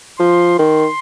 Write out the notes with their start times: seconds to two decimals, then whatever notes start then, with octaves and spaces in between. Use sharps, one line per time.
0.19 F3 C6
0.59 D#3 C6